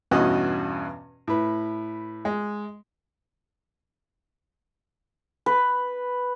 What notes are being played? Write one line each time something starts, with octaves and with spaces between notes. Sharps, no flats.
E2 G2 B2 C#4 F#4 D#5
A2 B4
G#3
B4